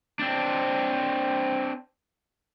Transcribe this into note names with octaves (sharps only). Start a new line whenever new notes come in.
C4 D4